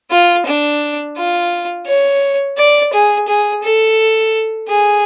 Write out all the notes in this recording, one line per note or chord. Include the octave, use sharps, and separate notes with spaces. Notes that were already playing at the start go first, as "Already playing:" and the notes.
F4
D4
F4
C#5
D5
G#4
G#4
A4
G#4